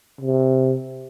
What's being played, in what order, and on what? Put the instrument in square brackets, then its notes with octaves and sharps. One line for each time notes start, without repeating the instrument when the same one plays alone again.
[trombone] C3